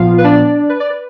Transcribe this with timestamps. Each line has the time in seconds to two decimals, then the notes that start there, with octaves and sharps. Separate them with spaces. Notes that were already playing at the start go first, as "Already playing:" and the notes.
Already playing: A#2 F3 B3 F4 F5
0.18 B4
0.24 D4 D5
0.69 B4
0.80 D5
0.90 B4